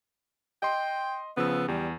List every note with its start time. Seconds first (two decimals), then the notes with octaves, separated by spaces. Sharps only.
0.63 D#5 G5 C6
1.37 C#3 F3 B3 E6
1.68 E2 G3